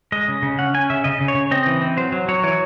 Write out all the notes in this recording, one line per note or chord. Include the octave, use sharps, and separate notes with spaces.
G#3 D#5
C#3
C#3
C#4 F#5
C#4 G#5
C#3 E5
C#3 D#5
C#3
C#5
C#3
C4 D#5
E3
C4
F#3 C5
F#3
F#3 C#5
E3 C#5